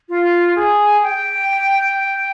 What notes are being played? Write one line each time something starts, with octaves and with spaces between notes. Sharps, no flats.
F4
G#4
G5